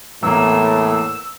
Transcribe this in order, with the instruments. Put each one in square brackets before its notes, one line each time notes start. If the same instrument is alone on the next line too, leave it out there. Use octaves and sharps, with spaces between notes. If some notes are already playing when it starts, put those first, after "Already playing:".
[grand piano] E2 A#3 [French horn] A2 [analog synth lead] E6